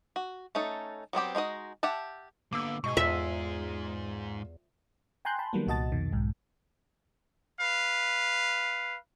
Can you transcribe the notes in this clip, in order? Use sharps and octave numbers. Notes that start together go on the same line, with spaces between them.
F#4
A3 C#4 D#4 A4
F#3 B3 C4 G4
G#3 D#4 F#4 D#5
G4 E5 F#5 A5
D3 A#3 B3 D6 E6
G#2 B2 G#4 D#5 C#6
E2 F4 E5
G5 G#5 A#5 C6 F#6 G6
A5 B5 C6
D#3 F#3 G3 A#3 B3
C2 A#2 F#4 D#5 A5 A6
F2 B2 D#3
B1 G#2
B4 F5